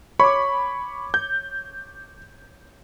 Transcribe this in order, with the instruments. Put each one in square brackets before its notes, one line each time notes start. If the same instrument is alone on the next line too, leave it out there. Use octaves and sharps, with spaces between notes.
[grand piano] C#5 D6 [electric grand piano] B5 C#6
[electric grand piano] G6